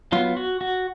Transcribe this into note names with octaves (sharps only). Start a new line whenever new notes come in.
F#3 B3 F4
F#4
F#4